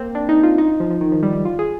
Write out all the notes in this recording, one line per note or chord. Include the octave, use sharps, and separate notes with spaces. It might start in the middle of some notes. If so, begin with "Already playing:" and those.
Already playing: A#3 C4
D4
D#4
F4
D#4
F3
F3
D#3
F3
G3
G3
F4
G#4